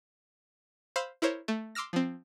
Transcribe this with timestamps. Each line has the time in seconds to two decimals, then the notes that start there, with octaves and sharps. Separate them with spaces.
0.96 C5 F5 B5 C6 E6
1.22 E4 A#4 C5 C#5
1.48 A3
1.75 C6 D6 E6 F6 A#6
1.93 F3 C4